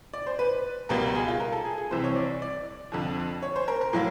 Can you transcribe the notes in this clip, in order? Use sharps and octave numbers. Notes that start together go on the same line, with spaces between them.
D5
C5
B4
C#2 B2 G3 A#3 A#4
G#4
F4
A#4
A4
G#4
G#4
C2 C3 E3 C5
C#5
D5
D5
F2 D3 F3
C#5
C5
A#4
A#4
A2 F#3 A#3